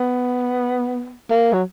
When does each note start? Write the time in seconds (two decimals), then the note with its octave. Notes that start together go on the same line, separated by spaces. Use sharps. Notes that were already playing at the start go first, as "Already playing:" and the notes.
Already playing: B3
1.30 A#3
1.53 F#3